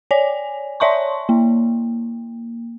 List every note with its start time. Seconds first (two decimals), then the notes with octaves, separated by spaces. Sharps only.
0.11 C#5 D5 G#5
0.80 C#5 D5 E5 A5 C6 C#6
1.29 A#3